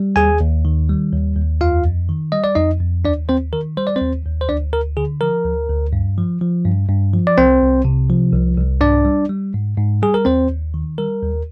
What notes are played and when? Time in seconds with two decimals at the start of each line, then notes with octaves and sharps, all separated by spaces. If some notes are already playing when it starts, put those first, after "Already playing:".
Already playing: G3
0.16 D#2 G#4 G#5
0.41 D#2
0.65 D#3
0.89 G3
1.13 D#2
1.37 D#2
1.61 F2 F4 F5
1.85 F2
2.09 D#3
2.32 G3 D#5
2.44 D5
2.55 F2 D#4 D#5
2.81 F2
3.04 D#2 D4 D5
3.28 D#2 C4 C5
3.53 D#3 A#4
3.77 G3 C5
3.87 D5
3.96 D#2 C4 C5
4.25 D#2
4.41 C5
4.49 D2 D4 D5
4.73 D2 A#4
4.97 D3 G#4
5.21 F3 A#4
5.45 D2
5.69 D2
5.93 G2
6.18 F3
6.42 F3
6.65 G2
6.89 G2
7.14 F3
7.27 D5
7.38 C2 C4 C5
7.62 C2
7.85 C3
8.10 F3
8.34 C2
8.57 C2
8.81 G#2 D4 D5
9.05 G3
9.29 G3
9.54 G#2
9.78 G#2
10.02 G3 G#4
10.14 A#4
10.25 D#2 C4 C5
10.50 D#2
10.74 D#3
10.98 G3 A#4
11.22 D#2